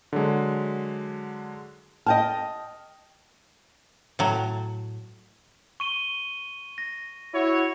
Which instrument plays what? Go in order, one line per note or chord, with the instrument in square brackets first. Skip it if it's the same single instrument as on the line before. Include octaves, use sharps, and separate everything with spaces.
[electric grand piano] D3 F#3 G#3
[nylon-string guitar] D#5 G5 A5 [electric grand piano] F6
[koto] A2 F#3
[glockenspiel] C#6 D#7 G7
A#6
[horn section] E4 F#4 C#5